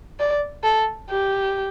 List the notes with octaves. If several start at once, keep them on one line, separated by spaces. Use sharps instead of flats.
D5
A4
G4